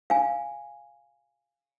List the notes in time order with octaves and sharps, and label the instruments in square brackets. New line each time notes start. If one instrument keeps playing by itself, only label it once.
[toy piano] F5 G#5